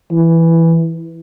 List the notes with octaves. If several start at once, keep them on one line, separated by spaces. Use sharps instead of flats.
E3